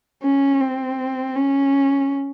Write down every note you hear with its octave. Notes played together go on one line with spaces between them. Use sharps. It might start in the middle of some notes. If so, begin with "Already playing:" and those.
C#4
C4
C#4